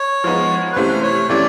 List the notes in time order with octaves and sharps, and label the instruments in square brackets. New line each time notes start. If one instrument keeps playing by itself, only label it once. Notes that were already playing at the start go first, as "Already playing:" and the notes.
Already playing: [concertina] C#5
[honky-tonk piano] F3 G#3 B3 D#4
[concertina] B4
[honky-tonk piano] C3 E3 A3 C#4 [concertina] C5
[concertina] C#5
[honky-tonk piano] C3 E3 A3 C#4 [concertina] D5